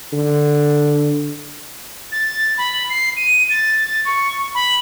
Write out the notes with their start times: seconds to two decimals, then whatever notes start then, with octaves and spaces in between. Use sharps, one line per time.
0.13 D3
2.12 A6
2.58 B5
2.90 C7
3.16 D#7
3.50 A6
4.05 C#6
4.55 B5